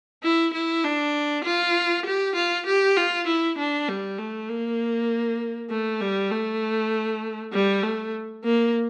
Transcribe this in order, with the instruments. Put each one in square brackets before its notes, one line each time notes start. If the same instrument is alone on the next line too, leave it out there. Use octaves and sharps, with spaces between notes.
[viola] E4
E4
D4
F4
G4
F4
G4
F4
E4
D4
G3
A3
A#3
A3
G3
A3
G3
A3
A#3